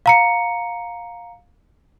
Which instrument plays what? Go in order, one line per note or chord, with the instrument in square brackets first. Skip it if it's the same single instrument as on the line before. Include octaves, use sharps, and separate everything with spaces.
[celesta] F5 A#5 C#7